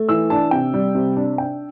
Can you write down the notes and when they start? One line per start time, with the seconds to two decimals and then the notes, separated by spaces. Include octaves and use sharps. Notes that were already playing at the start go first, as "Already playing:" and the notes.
Already playing: A3
0.09 E3 E6
0.30 D4 A5
0.51 C3 G5
0.74 G3
0.95 C3
1.16 D4
1.38 D4 G5